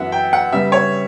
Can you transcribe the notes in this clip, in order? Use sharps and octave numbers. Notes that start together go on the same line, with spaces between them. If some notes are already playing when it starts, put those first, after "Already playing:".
Already playing: F#2 E3 B3 E5 F#5
G5
F#5
C#3 G3 B3 E5
C#5